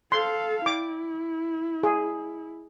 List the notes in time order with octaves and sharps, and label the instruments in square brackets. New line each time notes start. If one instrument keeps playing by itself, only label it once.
[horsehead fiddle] A4 F5 [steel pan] C6
[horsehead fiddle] E4 [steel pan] D6
[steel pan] G#4